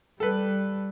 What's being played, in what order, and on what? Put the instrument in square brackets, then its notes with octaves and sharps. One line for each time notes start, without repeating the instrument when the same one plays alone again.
[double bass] G3 [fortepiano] A4 B4